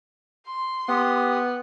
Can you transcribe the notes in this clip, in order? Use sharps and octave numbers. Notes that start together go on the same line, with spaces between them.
C6
B3 G4 D#6